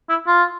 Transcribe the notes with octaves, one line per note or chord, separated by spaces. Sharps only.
E4
F4